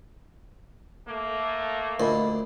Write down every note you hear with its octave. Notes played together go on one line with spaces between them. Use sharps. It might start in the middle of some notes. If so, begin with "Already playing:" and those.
A3 A#3
D2 A#2 A#4 D#5 B5